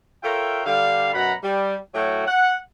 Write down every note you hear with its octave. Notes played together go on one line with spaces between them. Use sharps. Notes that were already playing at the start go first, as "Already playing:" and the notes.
F4 A4 A#4 C#5 E5 G5
D3 G3 F5
F#2 B2 F#3 F#5 A#5 B5
G3
A2 F#3 A3 F#4 C#5 G5
F#5